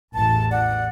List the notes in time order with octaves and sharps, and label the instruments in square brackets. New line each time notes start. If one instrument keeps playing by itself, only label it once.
[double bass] A1 E2 [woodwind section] A5
[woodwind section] D5 F#5